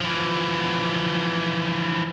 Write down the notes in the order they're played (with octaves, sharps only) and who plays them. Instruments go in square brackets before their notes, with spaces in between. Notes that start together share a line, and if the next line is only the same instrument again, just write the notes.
[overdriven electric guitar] E3 F3